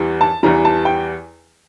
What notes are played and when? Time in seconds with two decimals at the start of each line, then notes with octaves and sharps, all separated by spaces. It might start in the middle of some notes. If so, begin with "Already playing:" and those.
Already playing: E2 E3 G3
0.21 A5
0.43 E2 E3 G3 A#5
0.65 A5
0.85 G5